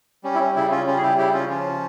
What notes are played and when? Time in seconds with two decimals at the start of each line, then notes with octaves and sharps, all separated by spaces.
0.24 G3 C#4
0.35 E4
0.40 C#4
0.56 C#3 E4
0.71 C#4 F4
0.87 G3 C#4 F4
0.97 G#4
1.03 E4 G4
1.18 C#3 E4 G4
1.34 C#4 F4
1.49 F3 C#4 F4